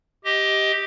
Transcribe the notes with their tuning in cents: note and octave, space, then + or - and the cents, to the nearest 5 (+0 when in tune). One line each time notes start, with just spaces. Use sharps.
G4 +0 D#5 +15